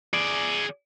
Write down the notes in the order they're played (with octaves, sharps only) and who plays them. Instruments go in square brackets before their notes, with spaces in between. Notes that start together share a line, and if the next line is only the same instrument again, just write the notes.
[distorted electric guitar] G#4 D5